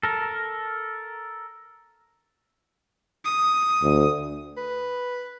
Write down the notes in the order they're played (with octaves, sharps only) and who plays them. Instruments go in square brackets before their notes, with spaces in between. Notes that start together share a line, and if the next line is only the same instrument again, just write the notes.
[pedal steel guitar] A4 A#4
[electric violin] D#6
[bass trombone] D2
[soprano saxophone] B4